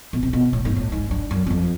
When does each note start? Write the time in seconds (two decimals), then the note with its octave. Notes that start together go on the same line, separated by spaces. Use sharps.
0.13 B2
0.23 C3
0.33 B2
0.53 A2
0.65 G#2
0.76 A2
0.92 G#2
1.11 G2
1.31 F#2
1.47 E2
1.50 F2